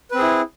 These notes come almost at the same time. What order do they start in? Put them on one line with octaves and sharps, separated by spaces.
B4 C4 G#4 E4